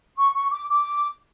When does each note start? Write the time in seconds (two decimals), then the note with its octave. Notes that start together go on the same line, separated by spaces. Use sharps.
0.17 C#6
0.34 C#6
0.52 D6
0.69 D6